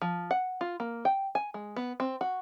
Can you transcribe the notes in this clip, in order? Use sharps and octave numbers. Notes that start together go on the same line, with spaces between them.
F3
F#5
F4
A#3
G5
G#5
G#3
B3
C4
F#4